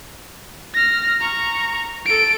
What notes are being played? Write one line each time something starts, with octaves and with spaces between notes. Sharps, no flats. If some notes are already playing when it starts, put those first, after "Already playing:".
F6 A#6
A#5 C#6
A4 D7